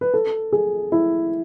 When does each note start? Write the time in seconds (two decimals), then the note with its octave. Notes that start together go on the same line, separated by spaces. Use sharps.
0.01 B4
0.14 A4
0.53 G#4
0.92 E4